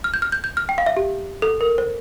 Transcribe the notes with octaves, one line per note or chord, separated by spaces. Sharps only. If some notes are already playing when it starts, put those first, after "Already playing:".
F6
G6
F6
G6
G6
F6
G5
F5
E5
G4
A4
A#4
C5